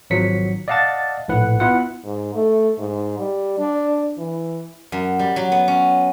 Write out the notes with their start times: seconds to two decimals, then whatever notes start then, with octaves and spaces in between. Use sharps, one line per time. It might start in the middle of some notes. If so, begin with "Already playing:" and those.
0.10 G#1 F3 F#3 B6 C#7
0.68 D5 D#5 F5 F#5 A5 A6
1.28 A#1 A2 B4 F#5
1.60 B3 E4 F4 F#5
2.04 G#2
2.35 A3
2.79 G#2
3.19 G3
3.59 D4
4.18 E3
4.92 F#2
5.19 G3
5.36 F#3
5.52 B3
5.68 C#4